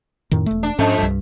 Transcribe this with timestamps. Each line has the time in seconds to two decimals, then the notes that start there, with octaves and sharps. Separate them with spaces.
0.31 F2 A2 D#3
0.46 E1 A3
0.63 D4
0.79 F2 G#2 A3 C#4
0.99 C2 G2